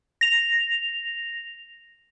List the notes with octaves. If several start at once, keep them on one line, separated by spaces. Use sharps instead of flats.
A#6 F7